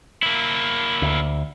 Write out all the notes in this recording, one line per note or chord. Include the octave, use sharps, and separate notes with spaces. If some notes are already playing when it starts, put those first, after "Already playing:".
A#3 E4
D2